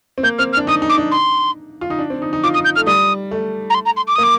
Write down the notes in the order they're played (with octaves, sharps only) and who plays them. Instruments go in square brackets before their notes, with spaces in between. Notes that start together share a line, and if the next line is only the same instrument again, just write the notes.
[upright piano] C4
[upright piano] A#3 [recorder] G6
[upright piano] C4 [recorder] F6
[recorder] F6
[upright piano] D4
[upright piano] D#4 [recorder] D#6
[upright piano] D#4
[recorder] D6
[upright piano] D4
[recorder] C6
[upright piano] F4
D#4
D4
C4
D#4
D#4
[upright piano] F4 [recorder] D6
[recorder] D#6
[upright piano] D#4
[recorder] G6
[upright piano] A3 [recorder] F6
[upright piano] G3 [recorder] D#6
[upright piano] A3
[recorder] A#5
C6
A#5
C6
D6
[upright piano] A#3 [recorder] D#6
[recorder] D6